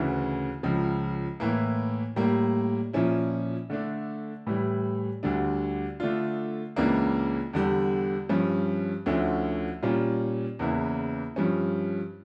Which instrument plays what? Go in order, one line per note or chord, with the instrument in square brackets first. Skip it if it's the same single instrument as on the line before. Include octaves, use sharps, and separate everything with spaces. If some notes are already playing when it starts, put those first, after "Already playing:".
Already playing: [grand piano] D2 C#3 E3
C#2 C#3 F3
A2 E3 A#3
A2 G3 A#3
A#2 F3 C#4 E4
D3 A3 D4
A2 E3 G3
D2 D3 G3 D4
D3 A3 D4 F4
C#2 C#3 E3 A#3 D4
E2 D3 G3
G2 F3 C#4
D2 D3 F3 C#4 E4
A#2 G3 C#4 F4
E2 C#3 E3 A#3 E4
G2 F3 C#4